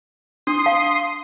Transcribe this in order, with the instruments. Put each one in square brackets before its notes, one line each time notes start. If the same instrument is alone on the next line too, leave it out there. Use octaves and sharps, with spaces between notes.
[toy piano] D4 [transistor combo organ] C6 D#6
[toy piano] F5 A5